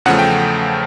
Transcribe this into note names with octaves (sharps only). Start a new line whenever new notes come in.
E2 C#3 F3 A3 F#5
G5